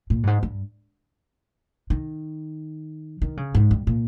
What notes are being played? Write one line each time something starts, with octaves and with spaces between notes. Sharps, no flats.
A#2
G2
G#2
G2
D#3
D#3
C#3
G#2
G2
A#2